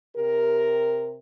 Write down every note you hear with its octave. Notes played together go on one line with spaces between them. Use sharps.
C3 G4 A#4